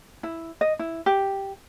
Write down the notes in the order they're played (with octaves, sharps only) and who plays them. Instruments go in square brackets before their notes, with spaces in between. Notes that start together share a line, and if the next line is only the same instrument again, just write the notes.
[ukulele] E4
D#5
E4
G4